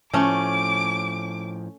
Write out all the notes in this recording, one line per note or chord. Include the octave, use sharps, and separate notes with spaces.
A2 F3 A3 C#4 D6